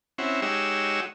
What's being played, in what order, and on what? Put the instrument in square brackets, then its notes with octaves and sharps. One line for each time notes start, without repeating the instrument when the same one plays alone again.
[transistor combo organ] C4 C#4 E4 F#4
G#3 D#4 F#4 G4 C#5 E6